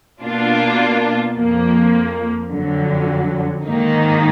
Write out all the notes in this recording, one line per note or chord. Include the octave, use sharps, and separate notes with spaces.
B2 A#3 D4 F4
F2 F3 A#3
F2 D3 F#3
G#2 D#3 A#3 D#4